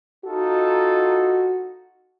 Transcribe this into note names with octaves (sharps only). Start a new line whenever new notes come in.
D#4 F4 F#4 A4